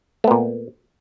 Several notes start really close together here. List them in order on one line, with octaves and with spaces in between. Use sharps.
A3 B3 A#2